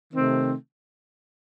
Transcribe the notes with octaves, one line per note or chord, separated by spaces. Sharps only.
C3 D#3 A3 C4